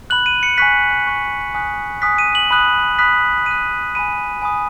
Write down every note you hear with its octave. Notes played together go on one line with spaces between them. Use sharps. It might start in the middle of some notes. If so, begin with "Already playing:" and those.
B5 F#6 F#7
D#7
C#7
G#5 C#6 F#6 B6
G#5 C#6 F#6
G#5 D#6 F#6 B6
G#5 D#6 F#6 B6
D#7
F#7
B5 D#6 F#6
B5 D#6 F#6 B6
G#5 B5 F#6 D#7
G#5 B5 F#6 D#7
G#5 B5 D#6